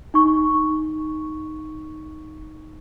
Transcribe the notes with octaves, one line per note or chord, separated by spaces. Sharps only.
D#4 C#6